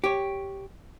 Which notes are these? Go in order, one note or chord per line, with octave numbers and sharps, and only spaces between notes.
G4 C#5